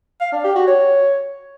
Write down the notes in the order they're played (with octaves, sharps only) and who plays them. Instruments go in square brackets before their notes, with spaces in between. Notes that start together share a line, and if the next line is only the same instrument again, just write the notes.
[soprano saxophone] F5
D4
G4
F#4
C#5